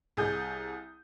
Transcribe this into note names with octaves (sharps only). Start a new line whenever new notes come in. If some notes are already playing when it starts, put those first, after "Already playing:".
C2 G#4 G#5 D#6 G6